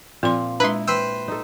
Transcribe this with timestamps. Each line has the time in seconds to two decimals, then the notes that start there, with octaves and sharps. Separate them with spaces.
0.23 A#2 F3 C4 C6
0.60 G#3 D4 E4 B4 C6
0.88 B4 C5 G5 E6
1.28 D#4 A4